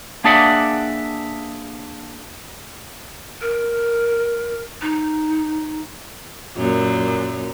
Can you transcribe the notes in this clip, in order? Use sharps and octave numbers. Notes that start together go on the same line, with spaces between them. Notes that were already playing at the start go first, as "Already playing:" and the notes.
A#3 D4 G#4 D5 E5 F#5
A#4
D#4
F#2 A#2 F#3